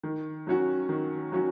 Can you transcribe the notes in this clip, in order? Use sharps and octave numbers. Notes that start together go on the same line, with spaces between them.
D#3
F#3 C#4 F#4
D#3
F#3 C#4 F#4